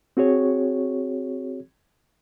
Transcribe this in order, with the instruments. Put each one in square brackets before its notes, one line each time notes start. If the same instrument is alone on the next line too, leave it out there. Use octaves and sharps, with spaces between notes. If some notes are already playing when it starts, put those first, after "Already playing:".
[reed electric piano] C4 F#4 G#4 C#5